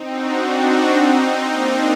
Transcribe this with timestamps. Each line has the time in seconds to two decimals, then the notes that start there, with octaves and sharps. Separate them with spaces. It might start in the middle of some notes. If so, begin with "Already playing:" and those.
Already playing: C4 D#4
0.09 D4 F#4
0.37 C4 D#4
1.50 A#3 D4